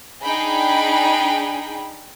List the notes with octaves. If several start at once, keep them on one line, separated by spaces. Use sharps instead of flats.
D4 D#4 G#4 G5 B5